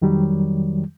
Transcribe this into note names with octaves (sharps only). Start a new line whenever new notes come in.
F2 D#3 F#3 G3